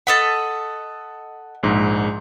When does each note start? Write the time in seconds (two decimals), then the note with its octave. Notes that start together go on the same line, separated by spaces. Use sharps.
0.07 A4 D#5 F#5 B5
1.63 A#1 G#2